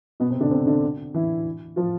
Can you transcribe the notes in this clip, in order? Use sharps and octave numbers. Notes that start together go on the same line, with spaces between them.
B2 B3
C3 C4
D3 D4
C3 C4
D3 D4
E3 E4
F3 F4